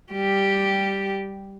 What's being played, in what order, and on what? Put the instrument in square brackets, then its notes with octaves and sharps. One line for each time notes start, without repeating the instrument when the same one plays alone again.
[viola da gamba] G3 G4